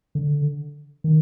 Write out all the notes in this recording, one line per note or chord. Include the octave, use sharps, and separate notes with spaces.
D3
D#3